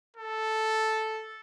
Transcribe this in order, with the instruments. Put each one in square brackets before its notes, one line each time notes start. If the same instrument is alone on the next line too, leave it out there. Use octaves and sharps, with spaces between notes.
[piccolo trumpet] A4